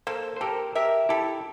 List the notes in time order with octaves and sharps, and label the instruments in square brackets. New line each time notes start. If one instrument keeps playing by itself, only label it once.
[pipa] A#3 [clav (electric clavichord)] A4 C5
[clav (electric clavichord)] C5
[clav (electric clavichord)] G4 A#4 [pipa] A4
[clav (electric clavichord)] G4 A#4 [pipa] E5
[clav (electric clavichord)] E4 G4 [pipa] A4